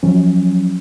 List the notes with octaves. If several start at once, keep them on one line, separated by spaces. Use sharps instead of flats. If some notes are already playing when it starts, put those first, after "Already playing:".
F3 F#3 C#4